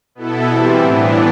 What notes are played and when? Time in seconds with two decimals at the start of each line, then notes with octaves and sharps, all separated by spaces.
0.15 B2 B3 E4 A4
0.47 E3 G3 C4 E4
0.80 A2 E3 B3 D4